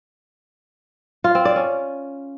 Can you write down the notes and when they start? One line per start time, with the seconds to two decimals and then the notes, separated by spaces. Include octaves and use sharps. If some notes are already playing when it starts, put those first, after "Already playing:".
1.24 F4
1.35 C4
1.45 D5
1.56 C#4